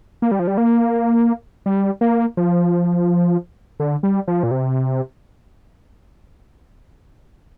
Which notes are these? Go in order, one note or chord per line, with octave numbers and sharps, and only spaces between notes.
A#3
G3
F3
G3
A#3
G3
A#3
F3
D3
G3
F3
A#2
C3